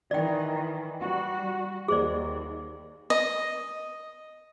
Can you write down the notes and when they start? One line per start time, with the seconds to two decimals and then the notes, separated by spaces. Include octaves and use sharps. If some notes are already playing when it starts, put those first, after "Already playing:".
0.11 D#3 E3 D5 G5
1.01 G3 F#4
1.88 D#2 G#4 C5 D5
3.10 D#5